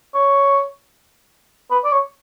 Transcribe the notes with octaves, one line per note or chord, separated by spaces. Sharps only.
C#5
B4
D5
C#5